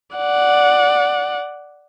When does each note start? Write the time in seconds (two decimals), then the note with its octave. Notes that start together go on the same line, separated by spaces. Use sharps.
0.16 D5 F#5